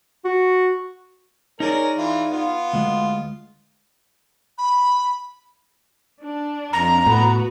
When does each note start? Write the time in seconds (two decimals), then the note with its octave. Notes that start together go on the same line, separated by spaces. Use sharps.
0.25 F#4
1.60 C#4 D#4 G#4 A#4 D5
1.97 E3 F4
2.31 B3 F4
2.73 D2 G#3
4.58 B5
6.23 D4
6.73 F2 A#5
7.07 A2 B3 F#4 B4